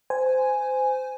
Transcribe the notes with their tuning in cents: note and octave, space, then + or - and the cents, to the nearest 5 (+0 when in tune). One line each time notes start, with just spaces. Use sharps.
C5 -25 G#5 +0